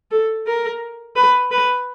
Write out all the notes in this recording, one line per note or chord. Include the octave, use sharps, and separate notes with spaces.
A4
A#4
B4
B4